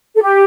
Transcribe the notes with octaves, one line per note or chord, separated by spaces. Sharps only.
A4
G4